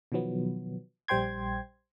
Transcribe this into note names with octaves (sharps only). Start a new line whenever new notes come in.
B2 D#3 F3 F#3 B3
A#1 G3 C5 G5 C6 G#6